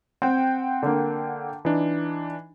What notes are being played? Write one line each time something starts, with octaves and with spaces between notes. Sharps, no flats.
C4 F#5 G5
D3 A#3
E3 D4 D#4